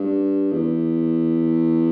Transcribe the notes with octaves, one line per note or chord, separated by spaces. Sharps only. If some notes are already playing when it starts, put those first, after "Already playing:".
Already playing: G2
E2